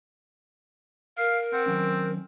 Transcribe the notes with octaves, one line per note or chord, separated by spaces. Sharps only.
A#4 F5
C4 F#5
D#3 F#3 C#4